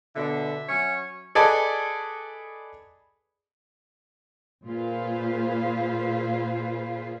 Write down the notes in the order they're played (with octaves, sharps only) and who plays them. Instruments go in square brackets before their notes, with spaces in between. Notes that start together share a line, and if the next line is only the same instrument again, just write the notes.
[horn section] B2 D3 [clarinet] E5
[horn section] F#3 C#4 C#5
[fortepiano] G#4 A4 B4 D5 D#5
[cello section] A#2 F4 G#4 B4 C5 F5